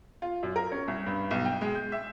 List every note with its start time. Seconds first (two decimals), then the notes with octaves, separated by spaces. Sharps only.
0.22 F4
0.43 F#2
0.56 A#4
0.72 C#4
0.88 C2
1.06 G2
1.31 B1
1.45 G5
1.61 G#3
1.75 G6
1.92 E5